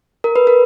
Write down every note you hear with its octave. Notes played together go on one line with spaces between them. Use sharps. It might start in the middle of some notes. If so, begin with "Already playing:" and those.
A#4
B4
A#4